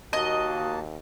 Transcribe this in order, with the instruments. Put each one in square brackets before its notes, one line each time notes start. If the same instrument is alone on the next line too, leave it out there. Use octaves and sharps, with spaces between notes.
[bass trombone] D#2 [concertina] A#3 A5 [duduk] F#4 [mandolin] D#5